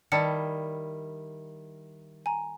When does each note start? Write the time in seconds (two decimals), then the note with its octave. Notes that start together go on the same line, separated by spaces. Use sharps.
0.12 D#3 G3 E4 D5 A5 C#7
2.26 G#5 A#5